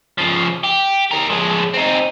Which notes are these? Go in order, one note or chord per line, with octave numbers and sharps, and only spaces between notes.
C#3 F3
G4
G4 A#4
F3 G#3
C4 D#4